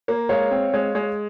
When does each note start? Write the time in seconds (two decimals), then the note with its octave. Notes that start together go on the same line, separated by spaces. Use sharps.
0.08 A#3
0.29 G#3 C#5 F5
0.51 C4
0.74 G#3
0.95 G#3